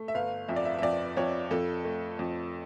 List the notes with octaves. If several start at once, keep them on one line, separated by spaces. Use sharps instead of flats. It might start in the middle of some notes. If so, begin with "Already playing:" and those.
Already playing: A3
E5
G1 F5
F2 E5
D5
E5
E5
F2 D5
F2 C#5
F2 A4
A3
F2